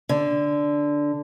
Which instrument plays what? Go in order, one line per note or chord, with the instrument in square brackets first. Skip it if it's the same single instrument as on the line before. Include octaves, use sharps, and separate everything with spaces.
[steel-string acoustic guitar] D3